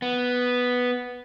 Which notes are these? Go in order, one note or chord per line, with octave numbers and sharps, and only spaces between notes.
B3